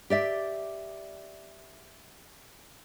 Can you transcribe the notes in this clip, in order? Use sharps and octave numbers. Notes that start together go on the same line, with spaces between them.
G4 D5 E5